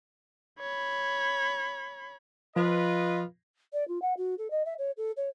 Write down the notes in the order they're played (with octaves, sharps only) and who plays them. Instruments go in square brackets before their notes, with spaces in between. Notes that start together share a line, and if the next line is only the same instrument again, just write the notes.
[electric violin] C#5 B5
[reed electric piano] F3 [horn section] F4 B4 D#5
[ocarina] D5
F4
F#5
F#4
A4
D#5
E5
C#5
A4
C#5